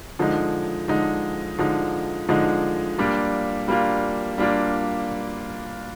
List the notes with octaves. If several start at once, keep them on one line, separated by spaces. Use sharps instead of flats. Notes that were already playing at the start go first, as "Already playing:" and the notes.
D3 F3 G#3 D#4
D3 F3 G#3 D#4
D3 F3 G#3 D#4
D3 F3 G#3 D#4
G3 A#3 D4 F4
G3 A#3 D4 F4
G3 A#3 D4 F4